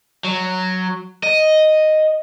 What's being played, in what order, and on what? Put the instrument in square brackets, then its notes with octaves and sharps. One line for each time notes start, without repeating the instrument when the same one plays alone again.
[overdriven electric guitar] F#3
D#5